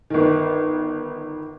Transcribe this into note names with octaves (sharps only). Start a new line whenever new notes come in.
G1 D#3